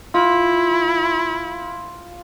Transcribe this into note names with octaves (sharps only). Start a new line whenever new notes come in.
E4 F4